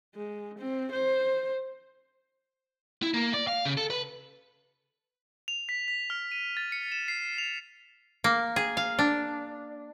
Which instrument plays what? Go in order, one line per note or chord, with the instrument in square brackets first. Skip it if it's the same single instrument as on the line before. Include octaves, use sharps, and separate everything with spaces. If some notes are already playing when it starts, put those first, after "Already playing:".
[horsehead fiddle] G#3
C4
C5
[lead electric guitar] E4
A#3
D5
F5
C#3
A4
B4
[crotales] F7
B6
B6
F6
D#7
A6
C#7
E7
C7
F7
[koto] A#3
G#4
F5
D4